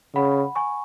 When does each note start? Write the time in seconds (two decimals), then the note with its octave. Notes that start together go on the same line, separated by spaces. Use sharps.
0.15 C#3 F#5 B5
0.55 G#5 C#6